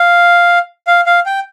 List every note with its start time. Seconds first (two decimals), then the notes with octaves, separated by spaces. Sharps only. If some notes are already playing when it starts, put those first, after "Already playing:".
Already playing: F5
0.87 F5
1.06 F5
1.26 G5